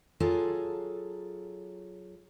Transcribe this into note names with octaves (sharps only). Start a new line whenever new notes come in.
F#3 F4 G#4 A4